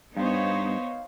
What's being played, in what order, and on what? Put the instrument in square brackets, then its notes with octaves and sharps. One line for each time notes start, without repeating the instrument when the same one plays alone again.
[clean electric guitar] G2 [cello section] B3 [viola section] D#4 C5 C#5 [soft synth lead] F5